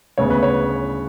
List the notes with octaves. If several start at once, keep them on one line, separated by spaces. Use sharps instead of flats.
D2 C#3 G#3 B3 C#5
B4
C#5